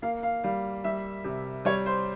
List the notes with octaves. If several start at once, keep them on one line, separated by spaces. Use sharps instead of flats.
A#3 F5
F5
G3 F5
G3 E5
C3
G3 C#5
C5